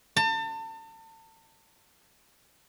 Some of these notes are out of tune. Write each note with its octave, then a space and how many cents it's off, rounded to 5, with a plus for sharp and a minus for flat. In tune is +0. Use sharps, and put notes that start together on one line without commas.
A5 +35